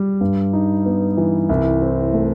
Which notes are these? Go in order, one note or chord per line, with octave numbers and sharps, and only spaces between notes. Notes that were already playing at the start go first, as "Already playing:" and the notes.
Already playing: G3
G2
D#4
B3
E3
C2
C4
A3